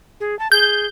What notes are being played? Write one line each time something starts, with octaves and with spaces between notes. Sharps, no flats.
G#4
A5
G#4 G6